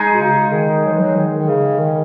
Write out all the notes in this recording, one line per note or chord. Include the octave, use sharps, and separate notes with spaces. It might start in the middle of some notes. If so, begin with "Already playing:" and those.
Already playing: G#3 D#4 G#4
B2
C#3
D#3
F#3
E3
F#3
D#3
D#3
C#3
D#3